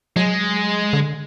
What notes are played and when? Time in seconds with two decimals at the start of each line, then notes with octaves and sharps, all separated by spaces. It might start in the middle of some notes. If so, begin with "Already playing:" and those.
0.16 F#3 G#3
0.93 D3